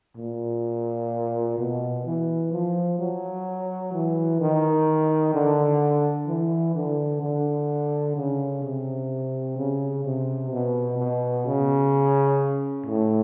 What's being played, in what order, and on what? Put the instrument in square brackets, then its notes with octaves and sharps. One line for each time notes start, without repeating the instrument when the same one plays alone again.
[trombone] A#2
B2
E3
F3
F#3
E3
D#3
D3
E3
D3
D3
C#3
C3
C#3
C3
B2
B2
C#3
A2